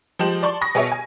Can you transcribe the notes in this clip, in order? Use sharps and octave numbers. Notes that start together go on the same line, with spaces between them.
F3 G#3 G4 E7 F#7
D5 A5 C6 C#6
B5 C#6 D#6 A#6
B2 B3 G#4 C#5 E5 C#6
G#5